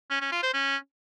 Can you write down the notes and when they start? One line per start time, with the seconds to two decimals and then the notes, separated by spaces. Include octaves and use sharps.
0.10 C#4
0.21 C#4
0.32 F4
0.43 C5
0.54 C#4